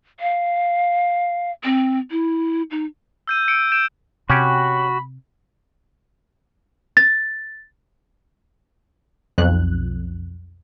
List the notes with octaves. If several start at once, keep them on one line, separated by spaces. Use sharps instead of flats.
F5
C4
E4
D#4
E6 G6 D#7
E6 C#7 D7
G6 D7 E7
C3 C#4 F#4 G4 B5
A6
B1 F2 F#6